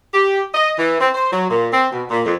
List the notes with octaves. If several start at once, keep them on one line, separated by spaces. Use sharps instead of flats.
G4
D#5
E3
C4
C5
F#3
A#2
C4
B2
A#2
F2